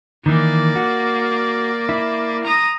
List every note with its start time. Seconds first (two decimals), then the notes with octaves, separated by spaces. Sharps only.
0.26 D#3 E3 A#3 D5
0.76 F#4
1.89 E4
2.44 A#5 D#6